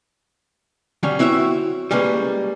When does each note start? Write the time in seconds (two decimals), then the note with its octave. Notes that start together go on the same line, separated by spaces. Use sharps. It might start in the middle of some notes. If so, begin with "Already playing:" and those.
1.03 D3 F#3 G3 C#4
1.19 C4 E4 F#4 C#5 E5
1.91 G3 G#3 A#3 C#4 B4